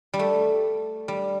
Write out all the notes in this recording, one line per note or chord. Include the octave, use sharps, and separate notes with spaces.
G3
A3
G3